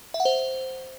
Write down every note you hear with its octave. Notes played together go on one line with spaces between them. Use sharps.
E5
F#5
C5